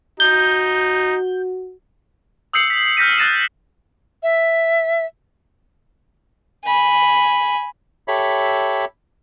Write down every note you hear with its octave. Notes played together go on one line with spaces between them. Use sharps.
D#4 F#4 G6
D#6 E6 G6 C7 C#7 F#7
B6
F6 G6 A#6 B6 D#7
E6 F#6 A6 A#6 D#7 E7
E5
G#5 B5
G4 A4 C#5 E5 B5